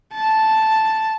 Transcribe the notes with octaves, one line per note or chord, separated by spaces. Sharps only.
A5